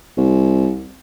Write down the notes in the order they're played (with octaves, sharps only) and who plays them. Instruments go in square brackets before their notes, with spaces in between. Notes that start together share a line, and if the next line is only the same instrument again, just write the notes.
[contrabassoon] C2